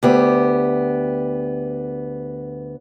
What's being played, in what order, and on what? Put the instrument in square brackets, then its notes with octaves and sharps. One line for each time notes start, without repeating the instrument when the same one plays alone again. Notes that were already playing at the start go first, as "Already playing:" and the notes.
[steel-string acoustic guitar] D2 B3 G4